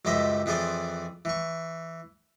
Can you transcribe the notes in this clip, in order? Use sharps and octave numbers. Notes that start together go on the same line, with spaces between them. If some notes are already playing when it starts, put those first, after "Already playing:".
C#2 F#2 G3 C5 D#5 E5
F2 E3 G#4 C5 D5 G#5
E3 C#6